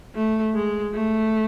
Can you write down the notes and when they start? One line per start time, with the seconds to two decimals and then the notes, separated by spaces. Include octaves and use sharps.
0.15 A3
0.54 G#3
0.94 A3